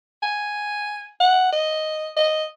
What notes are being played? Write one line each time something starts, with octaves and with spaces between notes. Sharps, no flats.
G#5
F#5
D#5
D#5